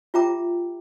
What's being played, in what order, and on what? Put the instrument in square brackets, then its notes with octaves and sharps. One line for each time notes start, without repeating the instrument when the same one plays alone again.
[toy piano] F4 G4 E5 G5 A#5 D6